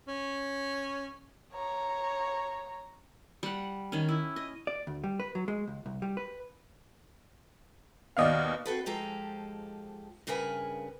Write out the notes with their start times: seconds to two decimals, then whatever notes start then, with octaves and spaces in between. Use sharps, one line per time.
0.08 C#4
1.53 C#5 A#5
3.43 G3 F#5
3.92 D#3 C#4
4.09 E4
4.36 D#5
4.67 D5
4.87 D2
5.04 G3
5.20 B4
5.35 F#3
5.48 G#3
5.68 C#2
5.86 C2
6.02 G3
6.17 B4
8.17 D#2 B2 D5 D#5 F5 F6
8.66 C4 F#4 A4 B4
8.86 G#2 F3 G#3 G4 A4 A#5
10.27 G2 C#3 G#4 A#4 B4 G#5